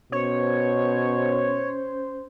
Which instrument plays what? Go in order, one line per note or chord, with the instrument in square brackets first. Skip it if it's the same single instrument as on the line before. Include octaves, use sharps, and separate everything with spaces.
[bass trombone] B2 [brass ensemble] C#4 C5 [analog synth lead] C#5